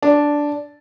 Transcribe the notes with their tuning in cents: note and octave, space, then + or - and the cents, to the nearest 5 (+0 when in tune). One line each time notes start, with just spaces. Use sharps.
D4 -5